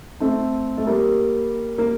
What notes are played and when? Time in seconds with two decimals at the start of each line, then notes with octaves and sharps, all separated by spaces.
0.20 A3 C4
0.77 A3
0.87 G3 A#3
1.78 A#3